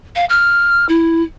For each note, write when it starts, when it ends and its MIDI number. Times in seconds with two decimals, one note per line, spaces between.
0.15 0.25 77
0.29 0.86 89
0.89 1.22 64